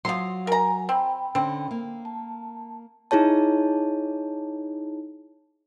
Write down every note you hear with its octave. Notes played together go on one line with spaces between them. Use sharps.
F3 F#3 F5 C6
A#4 G#5 A#5
C4 G5 B5
D3 C4 C#4
A#3
A5
D#4 E4 G#4 C#5 A5